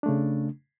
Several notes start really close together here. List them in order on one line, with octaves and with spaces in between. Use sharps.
D4 A3 C#3